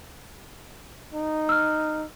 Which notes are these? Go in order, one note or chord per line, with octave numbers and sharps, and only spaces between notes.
D#4
E6 F6